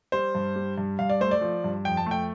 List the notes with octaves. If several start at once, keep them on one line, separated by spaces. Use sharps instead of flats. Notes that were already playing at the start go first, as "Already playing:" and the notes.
G3 C5
G2
G3
G2
G2 F5
D5
A3 C5
D5
F3
G2
F2 G5
A5
A3 G5